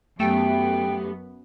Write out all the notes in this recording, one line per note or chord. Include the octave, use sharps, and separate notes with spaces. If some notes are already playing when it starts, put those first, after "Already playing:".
F#2 A3 B3 G4 G5